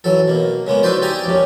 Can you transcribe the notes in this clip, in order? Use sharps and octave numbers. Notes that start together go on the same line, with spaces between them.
E3 F#3 A4
B2 A#3
C#3 G#3 A#3 B3
D#4 E4 F#4 B4 C5 D5
D#4 G4 D5 E5 G#5 A#5
A#1 G2 G3 C#4